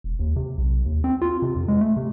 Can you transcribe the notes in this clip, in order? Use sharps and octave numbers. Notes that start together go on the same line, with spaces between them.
E1
D#2
C3
B1
D#2
C4
F4
C3
F2
G#3
A3
C3